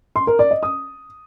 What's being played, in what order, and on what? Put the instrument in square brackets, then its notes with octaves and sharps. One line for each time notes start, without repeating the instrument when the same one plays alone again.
[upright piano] C6
A#4
D5
D#5
D#6